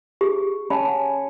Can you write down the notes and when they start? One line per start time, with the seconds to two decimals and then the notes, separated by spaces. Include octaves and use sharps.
0.21 G4 G#4
0.70 C#4 A5 B5
0.88 F#5